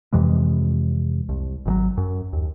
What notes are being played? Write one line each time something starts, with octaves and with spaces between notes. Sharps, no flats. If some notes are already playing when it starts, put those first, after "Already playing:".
F2 C3 E3 G#3
C2
G#1 D#3 F#3
F#2
D#2